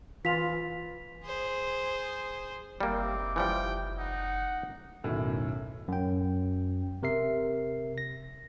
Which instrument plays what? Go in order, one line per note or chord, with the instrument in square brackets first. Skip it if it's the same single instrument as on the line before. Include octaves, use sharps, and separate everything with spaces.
[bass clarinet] E3 [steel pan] F4 [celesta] B6 F7
[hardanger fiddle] G#4 C5
[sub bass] F#1 [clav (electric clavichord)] G3 A#3 [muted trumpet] C4 [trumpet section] D#4 E5 D6
[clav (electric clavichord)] E3 F3 G3 [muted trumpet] G5
[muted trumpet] D#4 [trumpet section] F#5
[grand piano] B1 F#2 A2 D#3
[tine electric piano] F#2 G5
C3 A#4 E5 C7
A#6